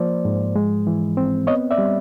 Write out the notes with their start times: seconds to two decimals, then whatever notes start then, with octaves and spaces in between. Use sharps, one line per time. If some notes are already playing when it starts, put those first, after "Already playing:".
Already playing: F3 A#3 C5 D5
0.25 G#2
0.56 G#3
0.87 E3
1.17 C4
1.47 B3 C#5 D#5
1.71 D5 E5
1.78 G3